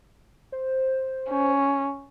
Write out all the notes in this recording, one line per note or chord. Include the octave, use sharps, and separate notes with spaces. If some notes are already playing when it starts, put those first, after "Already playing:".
C5
C#4